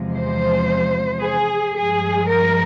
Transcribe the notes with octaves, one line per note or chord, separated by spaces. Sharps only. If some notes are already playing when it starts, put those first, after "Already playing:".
Already playing: E2 C3 F3 G#3
C5
G#4
G2 F3 G#3 G#4
A#4